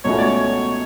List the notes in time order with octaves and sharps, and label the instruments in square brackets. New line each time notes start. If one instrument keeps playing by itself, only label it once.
[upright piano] C#2 B2 A3 C#4 F#4 [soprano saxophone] C#5
[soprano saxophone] D5
C#5